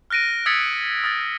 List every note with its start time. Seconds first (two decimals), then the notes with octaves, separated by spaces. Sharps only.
0.10 F6 F#6 A#6 D7 D#7
0.46 D#6 E6 G#6 A6 B6 C#7
1.04 D#6 F6 A6